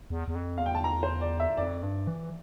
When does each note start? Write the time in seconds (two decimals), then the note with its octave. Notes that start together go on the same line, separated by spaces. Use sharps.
0.10 E2
0.28 E2
0.35 F2
0.58 E2 F5
0.66 G5
0.75 A5
0.84 A#5
1.03 C5
1.21 D5
1.40 E5
1.57 F2 D5
1.83 G2
2.07 E3